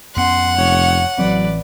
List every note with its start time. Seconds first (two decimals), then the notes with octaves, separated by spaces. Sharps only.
0.16 F2 B3 C#4 F#5 C6
0.57 F1 C#5
1.19 A1 E3 F#3 C4 B4 D5